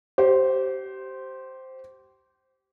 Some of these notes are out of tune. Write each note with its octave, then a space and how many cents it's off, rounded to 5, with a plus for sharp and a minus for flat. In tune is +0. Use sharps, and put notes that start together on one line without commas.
G4 -25 C5 +0